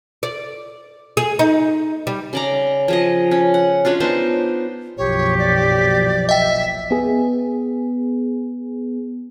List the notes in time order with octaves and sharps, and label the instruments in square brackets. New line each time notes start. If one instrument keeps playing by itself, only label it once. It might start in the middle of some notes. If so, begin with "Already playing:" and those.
[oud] D5
G#4
D#4
G3
[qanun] C#3 D5 A#5
F3 G#4 D#5
C#4
F#5
G#3 C#4 D4 F4
B3 D4 D#4 C5
[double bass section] F#1 B1 F3 [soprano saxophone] G4 [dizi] C#5
[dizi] D5
[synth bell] D#5 G5 [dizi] E5
[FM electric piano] B3 G#4